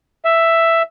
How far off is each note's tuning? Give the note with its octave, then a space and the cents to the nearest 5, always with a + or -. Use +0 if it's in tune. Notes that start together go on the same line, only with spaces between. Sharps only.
E5 +5